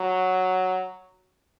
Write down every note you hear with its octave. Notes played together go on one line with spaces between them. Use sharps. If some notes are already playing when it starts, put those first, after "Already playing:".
Already playing: F#3